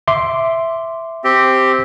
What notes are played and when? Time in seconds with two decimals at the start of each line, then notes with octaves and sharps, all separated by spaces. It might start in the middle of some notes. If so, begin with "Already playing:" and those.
0.08 E5 C6 D6
1.24 C4 G4